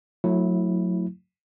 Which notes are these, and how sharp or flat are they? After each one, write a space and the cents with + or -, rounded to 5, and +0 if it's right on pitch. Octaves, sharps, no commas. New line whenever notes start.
F#3 -30 A3 +10 E4 -10